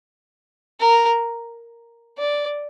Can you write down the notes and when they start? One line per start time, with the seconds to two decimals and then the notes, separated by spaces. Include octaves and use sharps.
0.80 A#4
2.18 D5